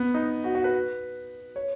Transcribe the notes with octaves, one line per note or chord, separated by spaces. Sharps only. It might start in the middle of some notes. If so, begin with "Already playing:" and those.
Already playing: B3
D#4
F#4
F#4
B4
C#5